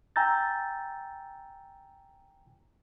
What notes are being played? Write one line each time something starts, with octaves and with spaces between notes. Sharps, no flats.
G5 G#5 A#5 E6 G6 A6